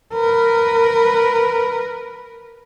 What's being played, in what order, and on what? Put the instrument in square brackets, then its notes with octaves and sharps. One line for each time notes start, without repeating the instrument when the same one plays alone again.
[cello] A#4 B4